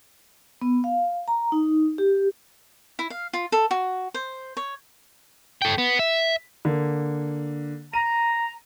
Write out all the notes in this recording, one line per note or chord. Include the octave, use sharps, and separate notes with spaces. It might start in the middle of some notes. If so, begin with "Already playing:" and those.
B3
F5
A#5
D#4
G4
E4
F5
F4
A4
F#4
C5
C#5
A4 G5
B3
E5
D3 A#3
A#5 D#7